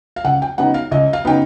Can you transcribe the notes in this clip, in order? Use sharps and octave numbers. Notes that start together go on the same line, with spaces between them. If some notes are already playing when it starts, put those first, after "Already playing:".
F5
C#2 F#5
G5
C#3 F#3 B3 D#4 F#5
F5
C#2 D#5
F5
C#3 F#3 B3 D#4 G5